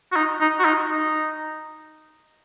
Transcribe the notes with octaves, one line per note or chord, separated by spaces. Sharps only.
F#4
D#4
D#4
F#4
D#4
D#4